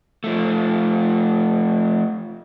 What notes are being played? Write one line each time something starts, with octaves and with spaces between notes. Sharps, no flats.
F3 A3